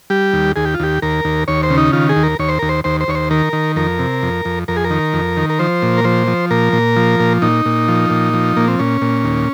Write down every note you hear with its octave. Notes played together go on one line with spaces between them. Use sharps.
G3 G4
D#2
D#2 G#4
G4
F4
D#2 G4
D#2 A#4
D#2
D#2 C#5
C5
C#3
D#4
D#3 F4
G#4
D#2
A#4
D#2 C#5
C5
D#2 A#4
C5
D#2 C5
C5
D#2 C#5
C5
D#3 A#4
D#3
F2 A#4
C3
F2
F2
F2 A#4
G#4
A#4
D#3
F2
D#3
A#4
F3 C5
A#2
A#4
F3 C5
F3
A#2 A#4
A#2
F3
A#2
A#2 D#4
A#2
F3
A#2
F3
A#2 A#3
C4
A#2 C#4
A#2
D#2